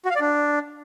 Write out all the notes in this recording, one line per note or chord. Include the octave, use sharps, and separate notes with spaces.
F#4
F5
D5
D4